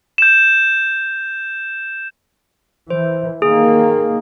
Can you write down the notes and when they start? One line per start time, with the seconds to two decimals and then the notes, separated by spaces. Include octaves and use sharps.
0.18 G6 E7
2.90 E3 C5
3.42 D#3 A#3 G#4